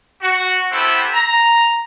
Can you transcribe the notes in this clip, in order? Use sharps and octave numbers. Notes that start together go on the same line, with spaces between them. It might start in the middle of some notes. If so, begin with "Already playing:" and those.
F#4
B3 C4 E4 G4 A4 E5
A#5